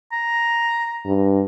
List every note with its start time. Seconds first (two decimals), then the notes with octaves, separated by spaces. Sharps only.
0.12 A#5
1.06 G2